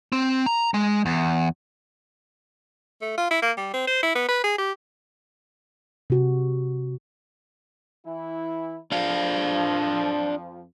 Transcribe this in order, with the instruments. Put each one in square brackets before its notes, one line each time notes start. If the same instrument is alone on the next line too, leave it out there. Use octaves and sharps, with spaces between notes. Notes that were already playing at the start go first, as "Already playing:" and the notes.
[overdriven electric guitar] C4
A#5
G#3
E2
[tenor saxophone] A3
F4
E4
A#3
G3
C4
C5
E4
B3
B4
G#4
G4
[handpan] C3 F#4
[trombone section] E3 E4
[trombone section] F2 F3 [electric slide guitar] D4 F5